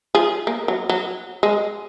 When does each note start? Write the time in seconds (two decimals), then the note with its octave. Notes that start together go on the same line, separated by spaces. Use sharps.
0.15 F4 G#4
0.47 A#3
0.68 F#3
0.89 F#3
1.43 G#3